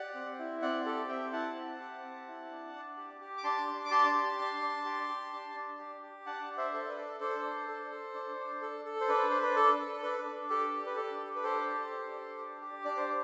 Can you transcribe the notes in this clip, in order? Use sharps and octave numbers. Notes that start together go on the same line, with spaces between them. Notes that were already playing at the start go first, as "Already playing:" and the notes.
Already playing: G4 D5 F#5
C4
E4
C4 D5 F#5
G4 A4
C4 E5 G5
E4 F#5 A5
C4
G4
C4
E4
D4
D4
G4
G4
D6
D4 A5 C6
D4
D6
G4 A5 C6
G4
D4
D4
G4
G4
D4
D4
G4
G4
D4 F#5 A5
D4
C5 E5
A4
E5
B4 D5
A4
D4 A4 C5
D4
A4
A4
D4
D4
A4
A4
C5
D4 B4
D4 C5
B4
A4
A4
D4 B4
D4
G4 A4
G4
B4
D4 A4
D4
B4
G4 A4 C5
G4
D4
D4
G4
G4
D4 D5
C5
D4